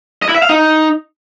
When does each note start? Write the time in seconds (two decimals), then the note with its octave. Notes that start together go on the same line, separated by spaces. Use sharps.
0.22 D#5
0.29 E4
0.36 E5
0.42 F5
0.49 D#4